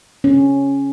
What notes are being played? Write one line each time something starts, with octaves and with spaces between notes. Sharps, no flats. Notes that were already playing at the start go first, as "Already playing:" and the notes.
C#4